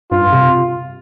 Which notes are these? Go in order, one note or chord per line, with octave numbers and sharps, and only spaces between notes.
G2 F4
C3